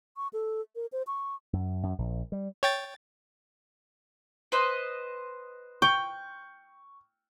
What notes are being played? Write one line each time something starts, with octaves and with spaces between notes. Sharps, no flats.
C#6
A4
A#4
C5
C#6
F#2
F#2
A#1
G3
C#5 G5 A6
B4 C5 D#5
G5 C#6